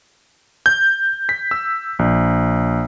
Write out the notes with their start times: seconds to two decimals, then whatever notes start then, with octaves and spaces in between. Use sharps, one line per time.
0.66 G6
1.29 B6
1.51 E6
1.99 A#1